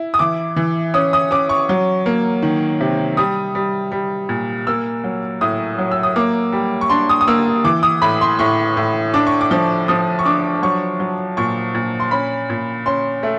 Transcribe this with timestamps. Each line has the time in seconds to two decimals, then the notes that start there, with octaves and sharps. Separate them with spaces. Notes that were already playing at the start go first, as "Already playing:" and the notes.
Already playing: E4
0.14 D#6
0.19 E3 D6
0.56 E3
0.94 C#4 D#6
1.13 D#6
1.31 C#4 D6
1.49 C#6
1.69 F#3
2.06 A#3
2.43 D#3
2.81 C3
3.17 G3 D#6
3.55 G3
3.92 G3
4.29 A#2
4.67 A#3 E6
5.04 F#3
5.41 A2 D#6
5.78 F#3
5.91 E6
6.03 D#6
6.16 A#3 D6
6.53 G3
6.81 C#6
6.90 D4 C6
7.09 D#6
7.21 D#6
7.28 A#3 E6
7.64 E3 D6
7.83 D#6
8.02 A2 B5
8.21 C6
8.39 A2 C#6
8.77 A2
9.14 D4 D6
9.27 C#6
9.41 D6
9.51 F3
9.88 F3 D#6
10.19 C#6
10.25 D4 D6
10.63 F#3 C#6
11.00 F#3
11.37 A#2 C#6
11.75 A#2
12.00 C6
12.11 C#4 B5
12.50 A#2
12.86 C#4 C6
13.23 A3